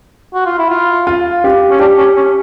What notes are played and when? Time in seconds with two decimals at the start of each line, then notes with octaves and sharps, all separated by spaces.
0.34 F#4
0.46 F4
0.58 E4
0.70 F4
1.07 F4
1.44 G4
1.70 C#4
1.79 D4 G4
1.98 C#4
2.16 C#4